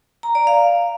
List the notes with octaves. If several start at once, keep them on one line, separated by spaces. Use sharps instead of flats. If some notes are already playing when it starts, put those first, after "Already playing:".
A#5
D5
F5